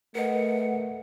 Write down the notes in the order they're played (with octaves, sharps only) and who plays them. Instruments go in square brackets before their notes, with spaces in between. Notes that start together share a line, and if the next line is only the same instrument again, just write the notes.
[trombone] A3 [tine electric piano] A#4 B4 D#5 [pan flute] F#5